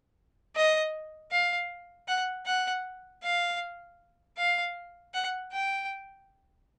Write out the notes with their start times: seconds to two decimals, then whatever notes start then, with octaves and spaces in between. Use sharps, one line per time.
0.56 D#5
1.32 F5
2.08 F#5
2.46 F#5
3.23 F5
4.37 F5
5.14 F#5
5.52 G5